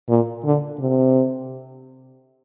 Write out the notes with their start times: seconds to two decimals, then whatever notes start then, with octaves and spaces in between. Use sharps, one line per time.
0.09 A#2
0.45 D3
0.80 C3